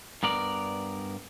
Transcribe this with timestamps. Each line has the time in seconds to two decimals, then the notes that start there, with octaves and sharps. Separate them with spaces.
0.23 G2 B3 A#4 D5